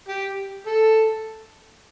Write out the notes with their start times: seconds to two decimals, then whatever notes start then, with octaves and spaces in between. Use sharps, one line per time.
0.08 G4
0.66 A4